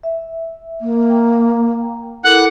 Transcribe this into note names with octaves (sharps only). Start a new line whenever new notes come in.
E5
A#3
G5 A#5
E4 A4 A#4 F#5 D6 F#6